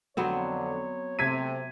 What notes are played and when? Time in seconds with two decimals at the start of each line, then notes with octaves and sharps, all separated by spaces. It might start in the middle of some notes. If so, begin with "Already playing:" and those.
0.17 F2 D3 F#3 B3 C4 C#5
1.19 C3 A3 G#6 B6 D#7